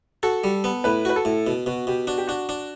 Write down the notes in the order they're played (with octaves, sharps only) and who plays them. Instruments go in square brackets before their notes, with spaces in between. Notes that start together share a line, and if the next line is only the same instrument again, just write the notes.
[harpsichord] F#4 [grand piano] A4
[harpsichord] G3
B3
[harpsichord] A2 [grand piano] B4
[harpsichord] F#4 [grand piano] B4
[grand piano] A4
[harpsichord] A2
B2
[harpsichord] B2 [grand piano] F#4
[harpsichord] B2 [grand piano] G4
[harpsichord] D4 [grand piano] F#4
[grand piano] G4
[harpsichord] D4 [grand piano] F#4
[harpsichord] D4